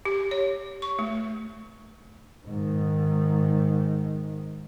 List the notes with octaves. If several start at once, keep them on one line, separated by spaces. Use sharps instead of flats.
G4
C#5
C#6
A3
G#2 D#3